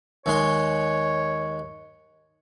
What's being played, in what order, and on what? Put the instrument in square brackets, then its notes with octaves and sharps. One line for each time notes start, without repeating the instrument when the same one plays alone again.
[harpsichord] D#2 G#3 C6 [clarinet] C#5